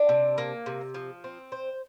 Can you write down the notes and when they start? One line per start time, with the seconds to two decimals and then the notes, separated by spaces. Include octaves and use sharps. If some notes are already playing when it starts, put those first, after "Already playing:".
Already playing: D4
0.09 C3
0.38 A#3
0.66 C3
0.94 F3
1.24 C4
1.52 C5